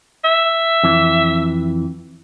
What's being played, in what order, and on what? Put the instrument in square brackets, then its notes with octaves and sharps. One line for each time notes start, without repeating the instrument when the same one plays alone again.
[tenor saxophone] E5
[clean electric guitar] F2 E3